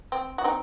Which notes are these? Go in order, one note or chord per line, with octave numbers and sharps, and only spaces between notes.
C4
F#4
C4 D#4